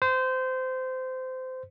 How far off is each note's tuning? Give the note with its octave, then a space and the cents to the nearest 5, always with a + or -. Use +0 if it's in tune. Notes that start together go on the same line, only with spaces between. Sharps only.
C5 -20